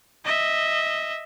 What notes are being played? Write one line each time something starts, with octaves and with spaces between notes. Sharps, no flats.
D#5 E5